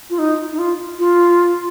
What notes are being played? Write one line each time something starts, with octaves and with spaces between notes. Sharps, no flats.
F4
D#4
D#4
F4
F4